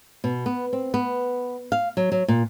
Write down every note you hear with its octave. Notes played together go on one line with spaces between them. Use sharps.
B2
B3
C4
B3
F5
F#3
F#3
A#2